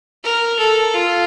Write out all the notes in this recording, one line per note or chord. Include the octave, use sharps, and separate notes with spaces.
A#4
A4
F4